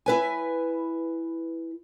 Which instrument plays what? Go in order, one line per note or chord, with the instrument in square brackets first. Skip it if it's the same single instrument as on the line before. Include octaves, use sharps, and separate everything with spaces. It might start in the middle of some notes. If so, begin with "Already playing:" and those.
[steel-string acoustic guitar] E4 B4 G#5